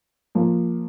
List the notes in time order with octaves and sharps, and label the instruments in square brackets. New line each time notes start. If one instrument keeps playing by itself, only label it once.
[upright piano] F3 A#3 F4